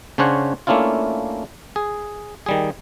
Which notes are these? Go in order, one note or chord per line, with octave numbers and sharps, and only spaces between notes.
C#3 C#4 D4 C5 C#5 F#5
A3 A#3 C#4 D4 E4 F4
G#4
D#3 G3 G#4